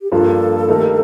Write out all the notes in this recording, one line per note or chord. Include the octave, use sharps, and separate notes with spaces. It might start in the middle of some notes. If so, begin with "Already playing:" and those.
G4
G2 F3 A#3 F4 A4
D#3 A3 D#4 G4 A#4